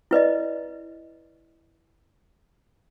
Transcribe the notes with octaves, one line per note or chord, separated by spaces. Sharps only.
E4 B4 D5 D#5